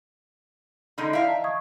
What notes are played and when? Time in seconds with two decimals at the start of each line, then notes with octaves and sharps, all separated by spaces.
0.98 D3 G#3 D#4 B5 G6
1.13 E4 D5 E5 F5 D7
1.28 D#5 A5 A#5
1.44 C#6 D#6 G#6